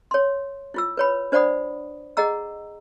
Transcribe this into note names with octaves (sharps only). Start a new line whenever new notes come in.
C#5 C6
E4 F4 E6
B4 C#5 B5
D4 C5 D5 F#5 B5 D#6
G#4 D#5 F#5 A#5 E6